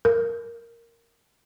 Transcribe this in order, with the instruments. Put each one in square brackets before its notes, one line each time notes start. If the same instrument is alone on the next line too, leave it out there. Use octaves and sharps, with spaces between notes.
[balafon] A#4